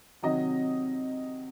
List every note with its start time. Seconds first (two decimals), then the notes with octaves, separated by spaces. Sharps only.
0.22 C3 D#3 F#3 D#5